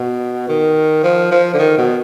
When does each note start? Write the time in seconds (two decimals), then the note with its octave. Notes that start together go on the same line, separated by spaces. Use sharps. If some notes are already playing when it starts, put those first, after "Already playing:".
Already playing: B2
0.48 D#3
1.03 F3
1.31 F3
1.54 D3
1.59 D#3
1.78 B2